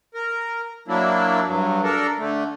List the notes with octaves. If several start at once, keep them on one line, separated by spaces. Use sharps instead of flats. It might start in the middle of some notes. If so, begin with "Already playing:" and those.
A#4
F#3 A#3 D4 E4
G2 F#3
D4 A4 A#4
D3 A3